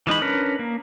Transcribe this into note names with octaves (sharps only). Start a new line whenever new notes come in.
E3 G#3 D#4 B5
C#4 D4 A#4 B4
A#3